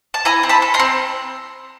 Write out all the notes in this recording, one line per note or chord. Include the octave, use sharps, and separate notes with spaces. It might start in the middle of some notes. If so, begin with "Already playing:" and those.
A5
E4 G#5 A#5
C4
A5 B5
A4
A#5 C6
C4